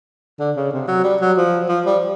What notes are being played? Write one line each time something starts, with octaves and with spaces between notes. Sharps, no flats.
D3
C#3
C3
F#3
G3
F#3
F3
F3
G3